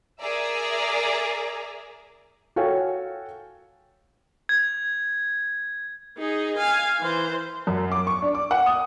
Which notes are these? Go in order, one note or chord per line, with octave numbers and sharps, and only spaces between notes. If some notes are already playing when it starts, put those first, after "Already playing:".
G#4 A#4 D5 E5 A#5
F#4 A4 C#5 F5 G5 G#5
G#6
D#4 G#4
F5 G#5
E3 C5
F#2
D6
C#6
D4
D6
F#5
D#6